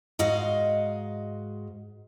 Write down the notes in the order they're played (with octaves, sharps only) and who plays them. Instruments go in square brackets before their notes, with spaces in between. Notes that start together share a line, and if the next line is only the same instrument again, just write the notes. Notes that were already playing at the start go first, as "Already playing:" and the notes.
[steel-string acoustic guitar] G#2 F#4 D#5 F5